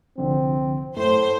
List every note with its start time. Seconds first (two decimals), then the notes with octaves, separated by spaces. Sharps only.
0.18 C2 D3 F3 C4
0.97 F#2 A2 A3 C5